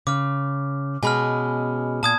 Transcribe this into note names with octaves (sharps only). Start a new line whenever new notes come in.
C#3 D6 F6
B2 G#3 C#4 G#5 B5 F6
A#2 A5 D#6 G#6